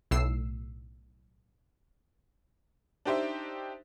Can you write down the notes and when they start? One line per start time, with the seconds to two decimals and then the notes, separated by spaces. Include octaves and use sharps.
0.11 B1 A2 E6 C7
3.05 D4 D#4 G4 C5 E5